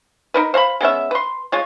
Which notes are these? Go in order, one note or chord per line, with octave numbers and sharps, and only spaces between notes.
D#4 A#4 B4
C5 F5 A#5 B5
G#3 B3 C#4 E5
B4 C6
G#3 F4 C#5